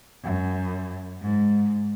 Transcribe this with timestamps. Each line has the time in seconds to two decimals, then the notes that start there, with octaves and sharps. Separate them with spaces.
0.24 F#2
1.22 G#2